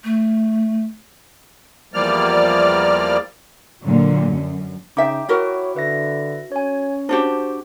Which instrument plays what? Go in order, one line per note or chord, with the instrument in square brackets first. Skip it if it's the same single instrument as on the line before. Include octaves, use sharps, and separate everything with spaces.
[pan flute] A3
[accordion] E2 F3 G3 A#3 D5 F6
[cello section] A#2 D3 F#3
F#2
[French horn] C#3 [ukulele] D#4 E5 [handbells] G5 D6
[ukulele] E4 F#4 A#4 [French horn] C#5
[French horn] D3 [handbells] B4 E5 A#6
[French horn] C#4 [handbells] C#5 G#5
[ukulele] D4 F#4 G4 [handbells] C5 A5